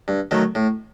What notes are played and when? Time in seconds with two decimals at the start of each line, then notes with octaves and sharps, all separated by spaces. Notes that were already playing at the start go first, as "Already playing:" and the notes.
0.08 G2
0.31 D#3 F#3 A3
0.55 A2